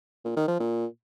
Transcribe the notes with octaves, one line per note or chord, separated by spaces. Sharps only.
A#2
D#3
F3
A#2